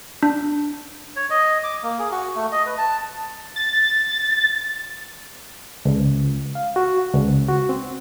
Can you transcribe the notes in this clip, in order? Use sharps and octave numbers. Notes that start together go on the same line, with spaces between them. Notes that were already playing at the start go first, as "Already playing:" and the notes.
D4
C#5
D#5
D6
A#3
G#4
F#4
A3
D#5
B4
A5
A6
C#2
F5
F#4
C#2
F#4
C4